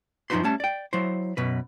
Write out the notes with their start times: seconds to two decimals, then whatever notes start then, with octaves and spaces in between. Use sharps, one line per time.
0.30 F#2 F3 D#4 F#4 B4 C6
0.43 G3 A3 C#4 A5
0.60 D5 G5
0.93 F#3 E4 C5
1.37 F#2 B2 B4